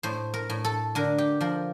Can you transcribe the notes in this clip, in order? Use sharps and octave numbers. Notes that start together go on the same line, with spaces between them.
A2 C5
A#4
A2
A4
D3 A#4
G4
F3 A#4